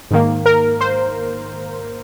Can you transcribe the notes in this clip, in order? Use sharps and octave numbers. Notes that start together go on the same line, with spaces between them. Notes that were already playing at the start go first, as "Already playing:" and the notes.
G#2 D#3 A#3
A#4
C5